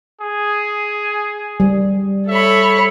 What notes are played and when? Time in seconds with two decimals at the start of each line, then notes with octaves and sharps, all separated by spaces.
0.21 G#4
1.60 G3
2.29 A4 C#5 E5 B5